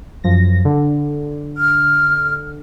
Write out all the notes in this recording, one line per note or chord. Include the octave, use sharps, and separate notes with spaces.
F#2 F3 A#6
D3
F6